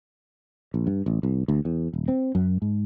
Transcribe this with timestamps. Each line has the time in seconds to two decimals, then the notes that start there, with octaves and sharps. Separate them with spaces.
0.74 A#1
0.87 G2
1.06 A1
1.23 C2
1.48 D2
1.65 E2
1.93 D#1
2.08 C4
2.35 F#2
2.62 G#2